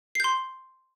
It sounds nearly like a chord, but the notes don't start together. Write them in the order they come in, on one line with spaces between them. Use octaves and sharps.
C7 G6 C6